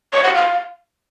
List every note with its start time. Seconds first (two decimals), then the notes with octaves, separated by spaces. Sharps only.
0.13 C#5
0.24 F#5
0.35 F5